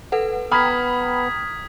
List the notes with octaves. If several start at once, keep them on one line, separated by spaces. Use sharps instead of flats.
A4 B4 F#5
B3 G5 A#5 B5 D#6 F6 G#6 B6